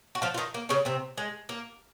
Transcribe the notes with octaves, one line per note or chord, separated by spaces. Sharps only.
F#4
F3 F4
F4
D#3 D#4
A#3
C#3 C#4
C3 C4
G#3
A#3